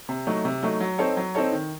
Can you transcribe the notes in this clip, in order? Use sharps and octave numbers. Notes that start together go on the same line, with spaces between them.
C3
F#3 A3 D#4
C3
F#3 A3 D#4
F#3
C4 D#4 A4 C#5
F#3
C4 D#4 A4 C#5
D#3